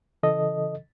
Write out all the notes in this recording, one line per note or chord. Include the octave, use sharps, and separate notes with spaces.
C#3 E3 A4 D#5